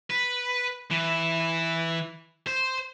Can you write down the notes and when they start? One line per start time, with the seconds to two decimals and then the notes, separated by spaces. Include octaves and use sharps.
0.10 B4
0.91 E3
2.47 C5